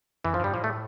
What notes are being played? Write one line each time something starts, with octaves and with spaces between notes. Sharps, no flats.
F2 E3
F3
G2 G3
A2 F3
A3